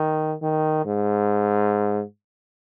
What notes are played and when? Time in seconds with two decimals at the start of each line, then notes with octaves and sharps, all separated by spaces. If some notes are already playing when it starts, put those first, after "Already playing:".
Already playing: D#3
0.42 D#3
0.85 G#2